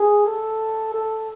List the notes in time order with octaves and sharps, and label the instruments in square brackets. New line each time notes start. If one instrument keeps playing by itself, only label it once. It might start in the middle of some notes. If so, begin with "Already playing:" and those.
Already playing: [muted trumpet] G#4
A4
A4